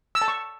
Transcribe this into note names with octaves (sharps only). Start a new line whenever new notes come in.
E6
A5
C#6